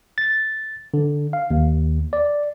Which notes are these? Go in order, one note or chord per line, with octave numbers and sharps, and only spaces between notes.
A6
D3
F5
D#2
D5